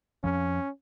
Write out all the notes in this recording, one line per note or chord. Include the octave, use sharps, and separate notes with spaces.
F2 F3 C#4